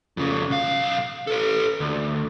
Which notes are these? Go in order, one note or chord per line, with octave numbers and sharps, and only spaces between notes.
F2 C#3
B1 F5
A4 B4
D2